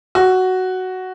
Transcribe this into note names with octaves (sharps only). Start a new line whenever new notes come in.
F#4